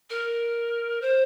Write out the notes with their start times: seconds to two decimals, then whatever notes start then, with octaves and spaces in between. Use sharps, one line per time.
0.09 A#4
1.01 C5